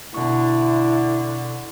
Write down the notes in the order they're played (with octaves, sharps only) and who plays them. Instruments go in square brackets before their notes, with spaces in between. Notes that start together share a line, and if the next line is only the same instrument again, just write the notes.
[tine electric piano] B2 C#6 [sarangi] D3 [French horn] E4